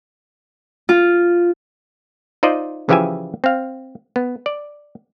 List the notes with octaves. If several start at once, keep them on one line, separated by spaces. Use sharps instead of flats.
F4
D#4 F4 C5 D5 D#5
C#3 E3 F3 G4 E5 G#5
C4 F5
B3
D5